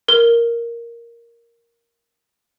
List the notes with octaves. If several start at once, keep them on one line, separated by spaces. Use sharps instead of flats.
A#4 G7